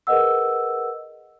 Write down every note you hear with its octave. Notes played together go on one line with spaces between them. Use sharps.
G#4 A#4 B4 D#5 F#5 E6